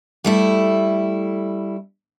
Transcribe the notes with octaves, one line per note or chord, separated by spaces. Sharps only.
G3 A3 E4